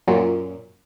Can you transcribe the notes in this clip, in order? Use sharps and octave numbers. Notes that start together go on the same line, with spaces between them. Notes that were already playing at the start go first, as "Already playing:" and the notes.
F#2 A#2